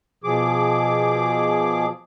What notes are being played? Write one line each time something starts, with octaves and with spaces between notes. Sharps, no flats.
B2 F3 G#4 D6